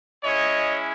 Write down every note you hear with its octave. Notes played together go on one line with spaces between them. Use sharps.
G#3 C#4 E4 C#5 D#5